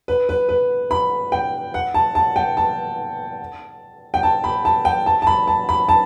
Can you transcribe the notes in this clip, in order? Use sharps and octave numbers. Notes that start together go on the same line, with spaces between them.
B4
B4
B4
B5
G5
F#5
A5
A5
G5
A5
G5
A5
B5
A5
G5
A5
A5
B5
A5
B5
A5